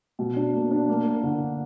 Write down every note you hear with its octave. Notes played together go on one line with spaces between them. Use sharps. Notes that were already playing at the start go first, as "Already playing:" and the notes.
B2
D4
A#3
D4
A#3
A#3
D3